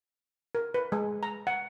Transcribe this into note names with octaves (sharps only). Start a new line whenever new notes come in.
A#4
B4
G#3
A#5
F#5